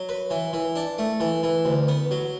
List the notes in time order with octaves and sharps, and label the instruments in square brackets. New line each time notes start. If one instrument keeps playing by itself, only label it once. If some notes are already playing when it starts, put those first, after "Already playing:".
Already playing: [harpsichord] F#3
B4
E3
E3
D4
A3
E3
E3
D2
B3
F#3